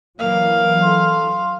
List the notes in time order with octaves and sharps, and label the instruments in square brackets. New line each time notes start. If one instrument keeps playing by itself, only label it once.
[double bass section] E3 F#3 [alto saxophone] A#3 [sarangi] F5
[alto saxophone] A4 [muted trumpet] C6